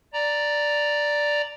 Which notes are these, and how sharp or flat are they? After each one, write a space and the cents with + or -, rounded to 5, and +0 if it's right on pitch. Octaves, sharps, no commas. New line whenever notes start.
D5 +0 A#5 +0